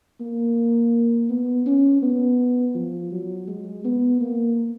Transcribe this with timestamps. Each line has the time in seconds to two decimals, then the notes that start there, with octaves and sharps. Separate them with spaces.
0.20 A#3
1.30 B3
1.66 C#4
2.02 B3
2.75 F3
3.12 F#3
3.47 G#3
3.85 B3
4.21 A#3